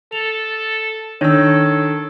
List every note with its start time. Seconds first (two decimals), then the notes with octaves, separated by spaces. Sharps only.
0.12 A4 F7
1.21 D#3 D4 D#4 A4 C#5 E6